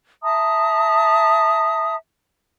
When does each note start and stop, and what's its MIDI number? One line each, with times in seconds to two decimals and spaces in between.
0.23 1.95 76
0.23 1.95 81
0.23 1.95 82
0.23 1.95 87